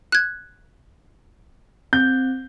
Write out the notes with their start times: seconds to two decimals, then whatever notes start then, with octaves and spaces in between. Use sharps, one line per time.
0.12 F#6 G#6
1.93 C4 G6